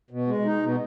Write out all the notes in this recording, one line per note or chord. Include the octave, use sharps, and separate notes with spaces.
B2
G#3
D#4
B2